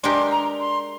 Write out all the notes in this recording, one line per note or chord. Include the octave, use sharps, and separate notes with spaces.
G#3 D4 G4 A#4 C6
A#5
C6